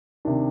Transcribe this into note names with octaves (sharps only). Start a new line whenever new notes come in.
C3 D#3 D4